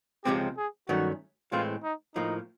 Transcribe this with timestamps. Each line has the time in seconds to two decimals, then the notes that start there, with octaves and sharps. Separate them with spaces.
0.25 C#2 C3 F3 G#3 C4 G4
0.57 G#4
0.88 G2 D#3 F#3 A3 C#4 F#4
1.52 A2 E3 G#3 C4 F4
1.83 D#4
2.15 A2 F3 A#3 D#4